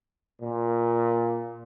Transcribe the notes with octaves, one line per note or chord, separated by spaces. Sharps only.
A#2